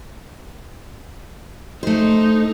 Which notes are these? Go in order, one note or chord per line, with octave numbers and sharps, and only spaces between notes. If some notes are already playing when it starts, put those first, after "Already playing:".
A3 D#4 C5